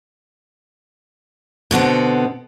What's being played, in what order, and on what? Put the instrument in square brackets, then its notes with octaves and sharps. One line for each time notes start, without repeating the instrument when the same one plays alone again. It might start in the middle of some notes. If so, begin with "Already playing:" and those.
[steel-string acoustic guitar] B2 D3 B3 C4